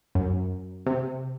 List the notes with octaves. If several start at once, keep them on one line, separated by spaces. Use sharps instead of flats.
F#2
C3